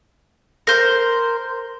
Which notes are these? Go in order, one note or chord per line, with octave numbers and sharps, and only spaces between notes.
A#4 C5